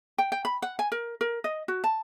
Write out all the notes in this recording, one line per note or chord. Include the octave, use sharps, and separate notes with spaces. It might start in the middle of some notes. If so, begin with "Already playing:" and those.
G5
G5
B5
F#5
G#5
A#4
A#4
D#5
F#4
A5